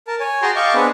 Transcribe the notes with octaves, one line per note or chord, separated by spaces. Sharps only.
A#4 A5
C#5 G#5
F#4 G#4 G5 A5 A#5 C6
D#5 F5 G5 A5 C#6 D6
B3 C4 D4 G#4 B4